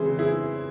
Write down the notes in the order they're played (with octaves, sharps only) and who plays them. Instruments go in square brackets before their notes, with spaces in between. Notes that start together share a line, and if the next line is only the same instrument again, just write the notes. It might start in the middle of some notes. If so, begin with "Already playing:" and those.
Already playing: [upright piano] C#3 E3 G#3 C4 E4 G#4 C5
E4 G#4